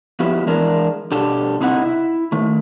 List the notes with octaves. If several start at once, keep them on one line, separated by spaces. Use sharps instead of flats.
F3 B3 E4 F#4 G4
E3 G#3 D4 A#4
B2 D4 G4 A4
C3 C4 D#4 E4 D5 F#5
E4
D#3 A3